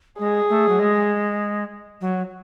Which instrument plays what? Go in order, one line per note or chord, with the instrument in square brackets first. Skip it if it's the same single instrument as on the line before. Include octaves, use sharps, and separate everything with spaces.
[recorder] G#3 [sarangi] G#4
[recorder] A3
F#3
G#3
F#3